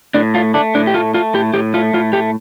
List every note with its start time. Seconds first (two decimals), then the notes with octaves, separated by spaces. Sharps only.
0.14 A2 D4
0.34 A3 F4
0.54 A3 D4
0.75 A2 D4
0.87 G4
0.94 A3 F4
1.14 A3 F4
1.34 A2 G4
1.54 A2 G4
1.74 A3 F4
1.94 A2 F4
2.13 A3 G4